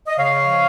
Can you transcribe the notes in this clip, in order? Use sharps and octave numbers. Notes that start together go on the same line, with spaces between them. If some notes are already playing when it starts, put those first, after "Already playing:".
D#5
C#3 C#5 F5
F3